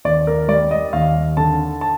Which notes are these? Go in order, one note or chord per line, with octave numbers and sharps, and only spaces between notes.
D#2 D5
A#4
G3 D5
D#5
D#2 F5
D3 A5
A5